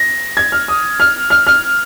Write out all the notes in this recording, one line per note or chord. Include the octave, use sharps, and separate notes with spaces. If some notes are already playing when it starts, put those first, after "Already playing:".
Already playing: A#6
G#6
F6
D#6
F6
F6
F6